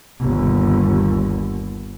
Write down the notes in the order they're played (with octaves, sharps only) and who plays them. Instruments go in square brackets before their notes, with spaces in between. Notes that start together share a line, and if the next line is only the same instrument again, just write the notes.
[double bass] G1 D#2